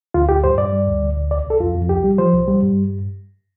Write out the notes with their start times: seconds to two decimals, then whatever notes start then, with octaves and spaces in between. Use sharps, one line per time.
0.14 D2 F4
0.29 D2 G4
0.44 G2 C5
0.58 G2 D5
0.73 G3
0.87 D2
1.02 D2
1.17 D2
1.31 C2 D5
1.46 C2 A4
1.60 F2 F4
1.75 F2
1.89 C2 G4
2.04 G3
2.18 F3 C5
2.33 C2
2.48 G3
2.63 G2